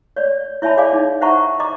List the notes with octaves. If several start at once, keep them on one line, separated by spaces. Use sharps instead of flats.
C#5 D5
E4 C#5 E5 G#5 A5 B5
G#4 C#5 D5 F5 G#5 D6
D#4 C#5
C5 E5 F#5 A5 A#5 C#6
D#5 A#5 D6